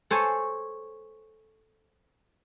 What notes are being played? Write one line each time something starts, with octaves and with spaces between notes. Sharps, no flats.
A4 C5 C#5 G#5 A5